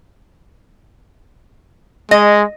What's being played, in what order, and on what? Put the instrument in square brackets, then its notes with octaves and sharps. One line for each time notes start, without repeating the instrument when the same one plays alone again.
[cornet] G#3 [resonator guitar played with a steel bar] D#5